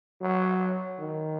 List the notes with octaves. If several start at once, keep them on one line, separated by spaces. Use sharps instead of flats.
F#3
D#3